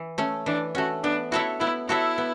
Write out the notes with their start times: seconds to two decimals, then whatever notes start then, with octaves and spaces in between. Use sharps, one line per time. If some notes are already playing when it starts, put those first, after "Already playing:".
Already playing: E3
0.18 A3 C#4
0.46 E3 D4
0.75 A3 C#4 F#4
1.03 B3 D4
1.31 E4 F#4 A4 C#5 E5
1.60 B3 E4
1.88 E4 F#4 A4 C#5 E5
2.18 B3